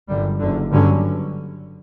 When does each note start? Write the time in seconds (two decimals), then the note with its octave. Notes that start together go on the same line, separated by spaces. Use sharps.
0.08 G1 F#2 D3 G3
0.40 F#1 F#2 D3
0.72 G2 D3 F#3 C#4